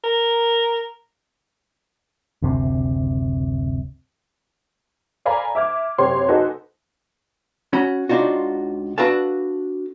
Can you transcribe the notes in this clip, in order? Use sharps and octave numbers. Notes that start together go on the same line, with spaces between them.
A#4
F#1 D2 C3
A4 D5 F5 G#5 A#5 B5
E5 D6 F6 G#6
F#1 C3 C#5 G5 C6
D#4 F#4 G#4 A4 B4 C5
C#4 F#4 B5
C#2 D4 D#4 F4 F#4
D4 F#4 A4 B4 F5 A5